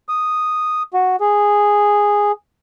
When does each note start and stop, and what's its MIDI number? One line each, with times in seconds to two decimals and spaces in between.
0.09 0.83 87
0.94 1.16 66
1.20 2.32 68